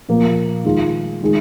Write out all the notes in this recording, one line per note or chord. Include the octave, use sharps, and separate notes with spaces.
A#2 F3 A#3
D#3 G#3 F4
D#3 G#3